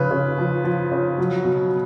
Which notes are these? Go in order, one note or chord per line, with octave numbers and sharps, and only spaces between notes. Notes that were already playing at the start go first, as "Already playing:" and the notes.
Already playing: C#3 F3 B4
C#3
F3
F3
C#3
F#3
B2